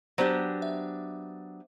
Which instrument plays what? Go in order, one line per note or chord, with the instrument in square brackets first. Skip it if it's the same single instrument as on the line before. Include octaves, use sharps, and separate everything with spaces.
[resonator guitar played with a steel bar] F#3 B3 D4 G4 [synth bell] C5
[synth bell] E5